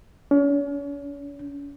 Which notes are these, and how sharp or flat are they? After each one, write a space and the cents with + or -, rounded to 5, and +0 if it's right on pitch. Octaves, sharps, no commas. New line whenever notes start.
C#4 +40